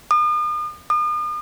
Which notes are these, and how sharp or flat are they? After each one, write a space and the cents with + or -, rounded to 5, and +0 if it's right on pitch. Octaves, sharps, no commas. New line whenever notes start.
D#6 -40
D#6 -40